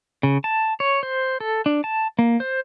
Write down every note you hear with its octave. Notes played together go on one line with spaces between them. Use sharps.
C#3
A5
C#5
C5
A4
D4
A5
A#3
C5